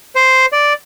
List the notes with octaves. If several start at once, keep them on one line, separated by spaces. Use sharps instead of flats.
C5
D5